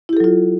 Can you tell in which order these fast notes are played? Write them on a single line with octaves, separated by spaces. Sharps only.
E4 G4 A4 F#3 F4